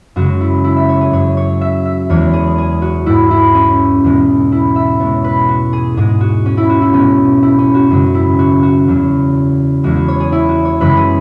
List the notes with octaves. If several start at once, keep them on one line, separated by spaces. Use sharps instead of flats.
F#2 C#3 G#3 F#4
E4
E4
E5
C#5
G#4
F#2 F#3 C#5
C#5
E5
E5
E2 E3 G#3 C#5
G#4
G#4
F#4
G#2 G#3 E4
E4
C#4
E2 B2 G#3
E4
E5
B2 G#3 C#5
B4
F#4
G#4
G#2 G#3 G#4
F#4
C#4
E4
F#4
E4
B2 G#3 C#4
E4
C#4
F#4
F#2 C#3 G#3 C#4
E4
F#4
F#4
E2 C#3 F#3
E2 E3 G#3 F#4
F#4
C#5
G#4
E4
F#4
C#5
F#2 C#3 E3 G#3 B4
G#4